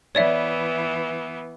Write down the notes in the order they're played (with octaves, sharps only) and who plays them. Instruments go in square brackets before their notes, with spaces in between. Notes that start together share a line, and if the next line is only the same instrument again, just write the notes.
[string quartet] E3 B3 [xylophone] C#5 D5 E5